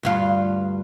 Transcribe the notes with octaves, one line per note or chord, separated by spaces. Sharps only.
D2 G2 F4